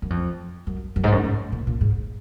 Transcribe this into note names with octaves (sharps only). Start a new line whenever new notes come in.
F#2
F2
F#2
F#2
G#2
F#2
G#2
A#2
A#2
G#2